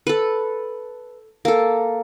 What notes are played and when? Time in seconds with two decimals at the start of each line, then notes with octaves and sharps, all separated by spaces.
0.07 A4 B4
1.45 A#3 A4